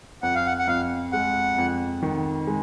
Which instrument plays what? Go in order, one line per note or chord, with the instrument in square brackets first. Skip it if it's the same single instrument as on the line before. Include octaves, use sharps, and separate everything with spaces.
[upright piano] F2 [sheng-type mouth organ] F#5
[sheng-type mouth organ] F5
F#5
F#5
[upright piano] F2 [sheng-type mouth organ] F5
[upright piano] G#3 [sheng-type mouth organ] F#5
[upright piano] F2
D#3
G#3